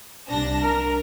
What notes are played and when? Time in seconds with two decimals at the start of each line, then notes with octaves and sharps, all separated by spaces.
0.29 C2 D4 A#6
0.63 A#4